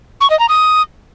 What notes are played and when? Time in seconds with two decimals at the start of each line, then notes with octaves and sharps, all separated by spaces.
0.21 C#6
0.30 D#5
0.39 A#5
0.49 D#6